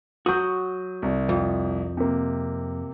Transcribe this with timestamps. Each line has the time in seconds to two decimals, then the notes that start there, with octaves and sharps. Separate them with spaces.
0.26 F#3 F#4 D#6 G6
1.02 C2
1.29 F2
1.97 C3 A#3